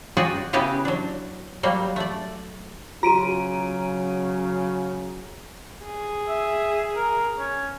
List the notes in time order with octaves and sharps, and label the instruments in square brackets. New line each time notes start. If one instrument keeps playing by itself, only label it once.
[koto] F#4 G#4 D5 D#5 G5
C#3 B3 E4 G4 B4 D#5
F#3 D4
F#3 G3 A#3
A3 D5
[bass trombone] C#3 [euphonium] F#3 [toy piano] F4 F#4 [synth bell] A#5 D7 D#7
[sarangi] G#4
[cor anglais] E5
A#4
C#4